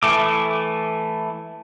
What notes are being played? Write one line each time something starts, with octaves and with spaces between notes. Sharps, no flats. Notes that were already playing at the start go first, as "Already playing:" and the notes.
E3 A3 D6